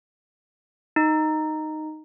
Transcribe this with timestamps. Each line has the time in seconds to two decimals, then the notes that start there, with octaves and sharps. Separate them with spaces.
0.96 D#4